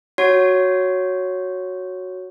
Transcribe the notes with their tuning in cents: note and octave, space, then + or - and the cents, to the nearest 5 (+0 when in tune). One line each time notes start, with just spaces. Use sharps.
F#4 -5 C#5 +0